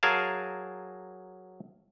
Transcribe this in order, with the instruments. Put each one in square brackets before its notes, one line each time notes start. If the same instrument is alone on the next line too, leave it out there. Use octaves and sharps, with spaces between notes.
[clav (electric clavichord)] F#3 G#4 A#4 F5 G#5 A5